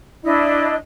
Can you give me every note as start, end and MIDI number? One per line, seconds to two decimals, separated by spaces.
0.23 0.74 62
0.23 0.74 64
0.23 0.74 75